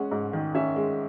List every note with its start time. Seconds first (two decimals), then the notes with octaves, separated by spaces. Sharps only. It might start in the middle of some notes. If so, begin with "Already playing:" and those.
Already playing: G#3 C#4 F#5
0.11 G#2
0.33 D#3
0.55 C#4 E5
0.76 G#3